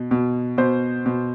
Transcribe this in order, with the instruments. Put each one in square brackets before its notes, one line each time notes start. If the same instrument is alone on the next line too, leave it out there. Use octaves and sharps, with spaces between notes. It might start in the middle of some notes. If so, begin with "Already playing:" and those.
Already playing: [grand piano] B2
B2
B2 C5
B2